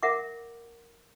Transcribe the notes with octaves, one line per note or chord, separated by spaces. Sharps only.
A#4 E5 F#5 D6